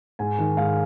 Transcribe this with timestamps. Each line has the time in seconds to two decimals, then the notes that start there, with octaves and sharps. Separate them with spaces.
0.19 G#2 G#5
0.39 D#3
0.57 G#2 F5